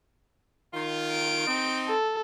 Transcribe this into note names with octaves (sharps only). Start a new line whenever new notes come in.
D#3 F4
D7
C4 D#4
A4